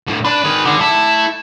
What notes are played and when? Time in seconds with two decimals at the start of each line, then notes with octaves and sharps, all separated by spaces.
0.07 A2 D3
0.25 D4 B4
0.44 D#3 G#4
0.65 D3
0.81 A3 E4 A4